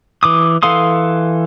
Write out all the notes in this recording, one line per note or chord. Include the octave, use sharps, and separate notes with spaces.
E3 D6 D#6
E3 A4 F5 C6 D#6